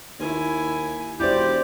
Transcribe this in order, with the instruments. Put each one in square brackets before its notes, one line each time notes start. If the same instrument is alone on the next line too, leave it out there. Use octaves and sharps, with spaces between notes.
[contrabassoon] D#2 [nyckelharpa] E4 G#5
[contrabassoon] E1 [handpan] E4 C5 [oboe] G4 [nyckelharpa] D5